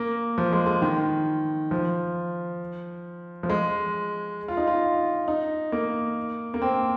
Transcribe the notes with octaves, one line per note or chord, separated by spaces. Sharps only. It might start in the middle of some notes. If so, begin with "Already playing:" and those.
Already playing: A#3
F3
G#3
G#3
D#3
F3
F3
G#3
F4
D#4
F4
D#4
A#3
A#3
C4